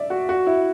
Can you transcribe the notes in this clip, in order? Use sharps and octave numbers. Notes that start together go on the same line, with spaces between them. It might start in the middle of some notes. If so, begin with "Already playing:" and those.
Already playing: D5 E5
F#4
F#4
E4